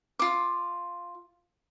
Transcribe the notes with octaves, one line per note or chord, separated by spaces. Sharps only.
F4 D6